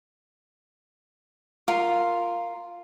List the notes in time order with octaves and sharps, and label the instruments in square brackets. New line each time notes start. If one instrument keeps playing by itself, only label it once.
[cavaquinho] F4 A#4